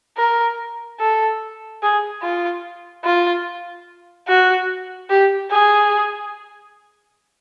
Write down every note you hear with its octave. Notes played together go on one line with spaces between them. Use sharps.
A#4
A4
G#4
F4
F4
F#4
G4
G#4